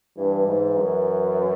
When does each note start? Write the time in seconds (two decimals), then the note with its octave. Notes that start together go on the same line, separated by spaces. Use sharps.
0.17 G2 E3
0.47 G#2
0.77 F#2